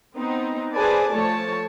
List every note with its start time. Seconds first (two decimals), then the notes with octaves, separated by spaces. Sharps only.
0.17 B3 C4 D#4
0.75 G#4 B4 C5 D5 G#5 A5
1.11 F3 A3 C#5 A5